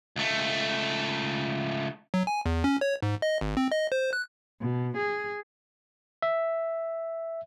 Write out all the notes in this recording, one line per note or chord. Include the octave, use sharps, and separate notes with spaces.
C#2 A3
F#3
G#5
E2
C#4
C#5
G#2
D#5
G#1
C4
D#5
C5
F#6
B2
G#4
E5